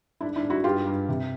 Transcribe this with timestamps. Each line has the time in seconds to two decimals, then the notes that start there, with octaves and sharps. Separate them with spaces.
0.21 G#2 D4 E4
0.36 D4 E4
0.43 G#2
0.50 E4 F#4
0.64 G2 F4 G4
0.86 G2
1.09 C3